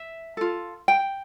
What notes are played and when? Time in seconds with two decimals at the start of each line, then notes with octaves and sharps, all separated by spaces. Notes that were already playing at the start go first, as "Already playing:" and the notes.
Already playing: E5
0.37 F4 A4
0.88 G5